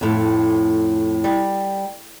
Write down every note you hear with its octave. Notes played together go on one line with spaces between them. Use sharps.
F2 A2
G3